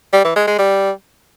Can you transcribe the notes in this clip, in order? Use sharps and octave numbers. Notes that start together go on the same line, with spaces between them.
G3
E3
G#3
G#3
G3